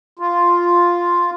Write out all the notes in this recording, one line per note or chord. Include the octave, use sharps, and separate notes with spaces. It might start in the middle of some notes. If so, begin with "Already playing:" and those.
F4